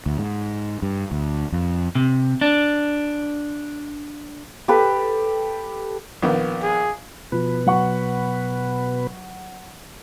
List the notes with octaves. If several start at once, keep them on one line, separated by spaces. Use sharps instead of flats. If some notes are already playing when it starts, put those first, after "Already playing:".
D2
G#2
G2
D2
F2
C3
D4
G4 A4 B4
A#1 D#3 B3
G#4
B2 F3 B4
F#3 F#5 C#6